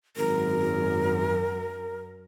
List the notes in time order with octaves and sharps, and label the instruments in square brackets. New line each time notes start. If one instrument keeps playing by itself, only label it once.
[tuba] G#1 [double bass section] F#2 [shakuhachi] A#4